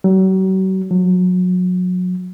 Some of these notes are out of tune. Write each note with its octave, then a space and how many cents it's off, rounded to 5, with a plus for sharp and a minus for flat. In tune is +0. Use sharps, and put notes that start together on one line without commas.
F#3 +40
F#3 -30